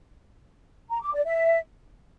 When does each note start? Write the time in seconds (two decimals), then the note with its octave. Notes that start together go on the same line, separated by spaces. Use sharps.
0.90 A#5
1.02 D6
1.14 D5
1.26 E5